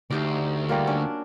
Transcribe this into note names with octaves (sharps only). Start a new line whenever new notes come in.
D2 D#4 G4 C5 D5
G3 A#3 F4 F#4
C#4 D4